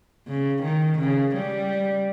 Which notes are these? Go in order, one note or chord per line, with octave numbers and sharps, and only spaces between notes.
C#3
D#3
C#3
G3